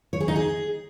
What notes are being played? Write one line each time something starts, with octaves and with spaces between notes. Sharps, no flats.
C#5
G#4
D#4
G#4